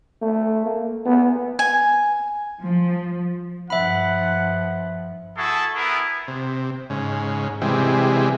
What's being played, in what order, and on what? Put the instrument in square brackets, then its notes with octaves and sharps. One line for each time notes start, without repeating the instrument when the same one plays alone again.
[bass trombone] A3
A#3
B3
[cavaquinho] G#5
[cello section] F3
[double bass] G2 F3 [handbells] E5 B5 [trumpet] F#5
[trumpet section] E4 F#4 G#4 A4
B3 E4 G#4 A#4
[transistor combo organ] C3
G#2 C#3
C3 E3 G3 G#3